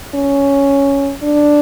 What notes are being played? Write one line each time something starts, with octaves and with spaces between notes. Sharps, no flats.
C#4
D4